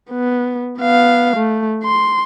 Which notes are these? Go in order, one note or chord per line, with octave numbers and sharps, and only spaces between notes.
B3
B3 F5
A3
C6